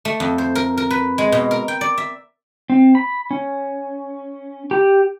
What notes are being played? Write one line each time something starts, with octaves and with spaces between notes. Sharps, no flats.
A3
F2
C5
A#4
A#4
B4
G#3
B2
A#4
G5
D5
E5
C4
B5
C#4
G4